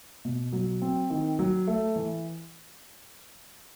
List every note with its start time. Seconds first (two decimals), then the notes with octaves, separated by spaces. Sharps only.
0.25 B2
0.53 F#3
0.82 C4
1.10 D#3
1.39 F#3
1.67 A3
1.96 E3